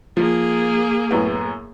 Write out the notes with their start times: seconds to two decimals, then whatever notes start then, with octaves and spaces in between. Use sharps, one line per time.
0.17 F3 A#3 G#4
1.11 F#2 A2 B3